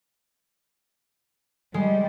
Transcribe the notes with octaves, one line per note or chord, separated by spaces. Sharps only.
G3 G#3